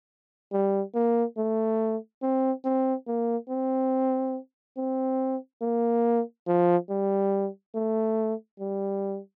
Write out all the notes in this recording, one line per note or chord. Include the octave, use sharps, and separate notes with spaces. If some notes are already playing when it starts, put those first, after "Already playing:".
G3
A#3
A3
C4
C4
A#3
C4
C4
A#3
F3
G3
A3
G3